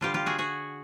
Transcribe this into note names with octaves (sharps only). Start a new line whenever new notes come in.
D3 G3 F4 G4
F4 G4
F#4 G#4
F#4 G#4